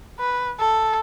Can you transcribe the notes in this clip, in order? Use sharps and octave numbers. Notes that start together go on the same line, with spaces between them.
B4
A4